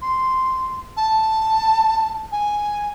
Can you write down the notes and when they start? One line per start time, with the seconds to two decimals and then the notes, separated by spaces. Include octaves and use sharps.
0.02 C6
0.97 A5
2.32 G#5